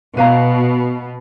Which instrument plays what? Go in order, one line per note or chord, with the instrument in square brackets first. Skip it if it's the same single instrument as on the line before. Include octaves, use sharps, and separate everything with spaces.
[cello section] B2 [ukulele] B4 F5 A#5